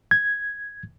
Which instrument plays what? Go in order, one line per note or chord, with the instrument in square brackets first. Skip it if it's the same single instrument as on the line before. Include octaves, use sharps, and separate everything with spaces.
[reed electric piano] G#6